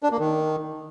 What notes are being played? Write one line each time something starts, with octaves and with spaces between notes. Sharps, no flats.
D4
A#3
D#3